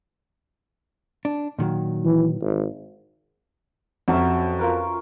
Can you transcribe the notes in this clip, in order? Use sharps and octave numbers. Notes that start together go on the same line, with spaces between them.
D4
A#2 D#3 F#3
E3
G#1
F2 F#3 C#4 E5
F4 A#4 B4